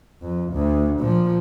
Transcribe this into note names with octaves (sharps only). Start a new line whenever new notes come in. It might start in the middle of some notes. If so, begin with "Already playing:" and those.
F2
D2
A#2 F3